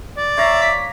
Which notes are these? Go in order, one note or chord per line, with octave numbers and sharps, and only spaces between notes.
D5
C#5 E5 F5 A#5
D6 B6